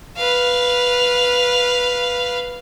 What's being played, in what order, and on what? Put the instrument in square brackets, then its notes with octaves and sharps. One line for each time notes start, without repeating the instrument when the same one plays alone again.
[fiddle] B4 F5